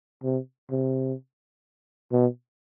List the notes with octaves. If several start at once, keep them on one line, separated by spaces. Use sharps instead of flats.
C3
C3
B2